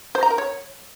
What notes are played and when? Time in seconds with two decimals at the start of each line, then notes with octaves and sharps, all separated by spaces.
0.15 C5
0.23 A#5
0.30 A#4
0.38 C#5